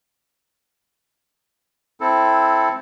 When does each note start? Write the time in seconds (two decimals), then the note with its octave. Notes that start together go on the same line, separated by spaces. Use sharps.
2.01 C4 E4 A4